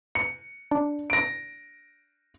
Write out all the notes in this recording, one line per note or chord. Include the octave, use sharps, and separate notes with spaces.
C#7
D4
A#6 D7